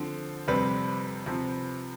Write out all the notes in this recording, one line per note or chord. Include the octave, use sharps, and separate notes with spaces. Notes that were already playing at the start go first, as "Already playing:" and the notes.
Already playing: D3 F3 C4
F2 C3 G3 C4 B4
C3 F3 C4